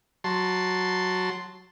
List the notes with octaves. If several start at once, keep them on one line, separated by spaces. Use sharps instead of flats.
F#3 A5 C6